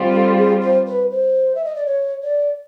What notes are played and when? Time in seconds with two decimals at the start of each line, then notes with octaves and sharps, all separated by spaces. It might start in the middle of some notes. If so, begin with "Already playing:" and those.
Already playing: G3 C4 F4
0.12 A4
0.37 G#4
0.61 C5
0.87 B4
1.11 C5
1.55 E5
1.65 D#5
1.75 D5
1.86 C#5
2.23 D5